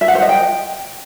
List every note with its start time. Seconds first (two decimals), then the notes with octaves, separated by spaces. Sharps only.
0.01 E5
0.08 F#5
0.15 C5
0.22 D#5
0.29 G5